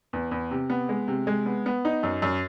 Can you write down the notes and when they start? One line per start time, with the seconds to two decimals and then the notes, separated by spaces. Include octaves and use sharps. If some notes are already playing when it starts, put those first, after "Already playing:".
0.13 E2
0.31 E2
0.51 C3
0.70 B3
0.89 G#3
1.08 C3
1.27 G#3
1.46 B3
1.66 B3
1.85 D#4
2.03 F#2
2.22 F#2